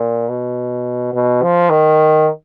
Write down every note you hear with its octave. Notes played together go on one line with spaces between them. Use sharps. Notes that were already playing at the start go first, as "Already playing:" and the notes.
Already playing: A#2
B2
B2
F3
D#3